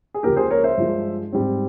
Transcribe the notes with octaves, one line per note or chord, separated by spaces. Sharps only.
G#4
C#2 C#3 F3 A#3 G4 A#4
G#4 C5
A#4 C#5
C5 E5
G2 F3 G#3
G#2 G3 C4